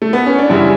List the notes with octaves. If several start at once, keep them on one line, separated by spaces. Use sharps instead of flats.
A3
B3
C#4
D4
F#2 C#3 E3 G3 E4